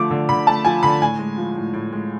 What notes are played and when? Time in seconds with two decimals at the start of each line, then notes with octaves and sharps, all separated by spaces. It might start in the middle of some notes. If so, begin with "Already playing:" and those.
Already playing: D3 F3 A3 D6
0.11 D3
0.29 D3 B5
0.47 A3 A5
0.65 F3 G#5
0.83 D3 B5
1.01 A2 G#5
1.19 G#3
1.38 F3
1.56 A2
1.73 A2
1.93 G#3